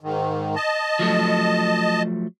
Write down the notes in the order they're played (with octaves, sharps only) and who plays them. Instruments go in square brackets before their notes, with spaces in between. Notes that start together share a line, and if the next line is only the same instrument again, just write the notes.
[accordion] G#2 D#3
D#5 A5
[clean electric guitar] F3 F#3 A3